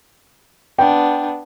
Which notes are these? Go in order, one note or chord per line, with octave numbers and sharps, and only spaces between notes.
B3 D4 G5